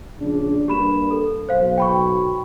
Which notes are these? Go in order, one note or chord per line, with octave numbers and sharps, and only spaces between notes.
A#1 C#3 D4
G2 A#3 G4 B5 E7
A4
B1 C5 F5
G5 B5 C#6